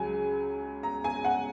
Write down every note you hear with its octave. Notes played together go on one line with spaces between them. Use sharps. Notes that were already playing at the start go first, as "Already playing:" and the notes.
Already playing: C#2 C#3 F#3 G#5
A#5
G#5
F#5